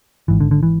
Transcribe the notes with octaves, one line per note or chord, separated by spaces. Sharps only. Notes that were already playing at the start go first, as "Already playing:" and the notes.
G#1 G#2 E3
D3
D3
E3